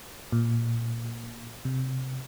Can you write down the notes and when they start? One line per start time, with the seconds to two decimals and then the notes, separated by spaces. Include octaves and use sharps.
0.32 A#2
1.65 C3